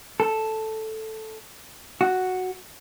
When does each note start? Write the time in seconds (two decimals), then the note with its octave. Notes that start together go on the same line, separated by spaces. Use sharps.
0.20 A4
2.01 F#4